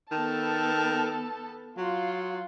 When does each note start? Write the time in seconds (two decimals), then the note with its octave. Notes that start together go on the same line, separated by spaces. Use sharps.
0.12 D#3 B3 A4 A5
1.77 F#3 F4